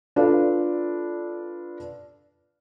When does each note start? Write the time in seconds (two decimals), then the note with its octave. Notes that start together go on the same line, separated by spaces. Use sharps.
0.16 D4 F4 A4 B4 D5 F5